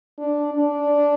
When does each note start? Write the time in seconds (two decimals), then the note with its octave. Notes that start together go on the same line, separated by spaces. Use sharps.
0.18 D4
0.53 D4